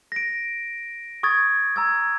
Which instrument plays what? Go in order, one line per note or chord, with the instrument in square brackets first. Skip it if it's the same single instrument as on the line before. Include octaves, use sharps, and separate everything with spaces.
[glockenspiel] A#6 D7
C#6 D#6 G#6 A6
A#5 E6 G#6